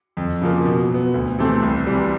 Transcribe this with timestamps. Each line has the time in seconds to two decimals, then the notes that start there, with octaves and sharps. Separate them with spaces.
0.17 F2
0.42 C#3 F3 A#3
0.65 B2
0.90 F#3 B3
1.14 D2
1.39 C3 E3 A3 C4
1.62 C2
1.87 C3 E3 G3